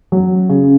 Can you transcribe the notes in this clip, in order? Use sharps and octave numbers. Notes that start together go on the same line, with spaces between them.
F#3
C#3